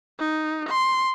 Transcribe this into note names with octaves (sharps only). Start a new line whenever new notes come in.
D#4
C6